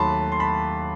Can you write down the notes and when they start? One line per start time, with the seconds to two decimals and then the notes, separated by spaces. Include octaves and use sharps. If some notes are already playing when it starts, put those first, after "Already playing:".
Already playing: D#2 D#3 F#3 A3 A5 B5 C6
0.32 C6
0.40 A5 B5